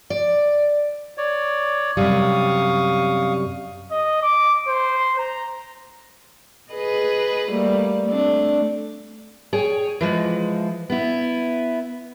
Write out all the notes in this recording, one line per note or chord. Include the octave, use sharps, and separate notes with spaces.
D5
C#5 D5
F#2 C3 G3 F5 C#6 D#6
D#5
D6
C5
A#5
G#4 B4 D#5
G3 A3 A#3
A3 C4 D4
G#4 C#5 G5
E3 F3 G#3
B3 E4